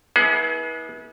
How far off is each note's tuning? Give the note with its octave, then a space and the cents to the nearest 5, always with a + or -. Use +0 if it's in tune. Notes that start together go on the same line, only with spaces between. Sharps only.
B3 -30 E4 -35 G#4 +25